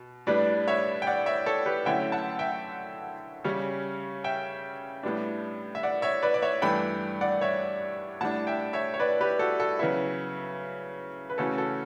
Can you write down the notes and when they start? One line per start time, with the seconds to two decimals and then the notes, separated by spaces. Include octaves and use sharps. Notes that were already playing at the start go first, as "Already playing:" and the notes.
Already playing: B2
0.27 A2 G3 D4 B4 D5
0.68 C#5 E5
1.02 G5
1.07 D5 F#5
1.26 C#5 E5
1.46 A4 C#5
1.66 G4 B4
1.85 D3 F#3 A3 C#4 E4 E5 G5
2.12 F#5 A5
2.39 E5 G5
3.44 C#3 G3 C#4
4.24 E5 G5
5.03 A2 G3 B3 D4
5.75 E5
5.83 D5 F#5
6.02 C#5 E5
6.22 B4 D5
6.34 D5
6.42 C#5 E5
6.62 G2 E3 A3 D4 G5 B5
7.21 D5 F#5
7.41 C#5 E5
8.21 A2 G3 D4 F#5 A5
8.47 E5 G5
8.73 C#5 E5
8.94 C#5
9.00 B4 D5
9.21 G4 B4
9.39 F#4 A4
9.59 F#4 A4
9.79 C#3 F#3 B3 E4
11.30 B4
11.38 C#3 E3 A3 C#4 F#4 A4
11.58 F#4 A4